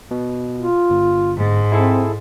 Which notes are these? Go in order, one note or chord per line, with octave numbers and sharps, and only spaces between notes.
B2
F4
G1
G#2
C4 E4 G#4 A4